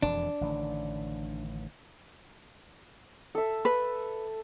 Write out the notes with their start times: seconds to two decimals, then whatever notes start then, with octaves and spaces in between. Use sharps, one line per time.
0.02 E1 F2 E3 D4
0.41 A1 D3 D#3
3.35 A4 E5
3.65 B4